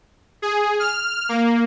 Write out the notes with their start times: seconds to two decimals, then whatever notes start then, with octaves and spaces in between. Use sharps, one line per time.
0.42 G#4
0.80 F6
1.29 A#3